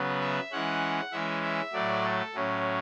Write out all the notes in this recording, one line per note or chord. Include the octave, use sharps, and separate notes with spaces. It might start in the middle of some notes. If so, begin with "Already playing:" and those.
Already playing: C#3 F#3 B3
E5
E3 G#3 C#4 F#5
E3 G#3 C#4 E5
E5
A2 F#3 A3 D5
A4
A2 F#3 C#4